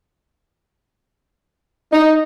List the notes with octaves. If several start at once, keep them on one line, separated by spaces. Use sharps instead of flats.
D#4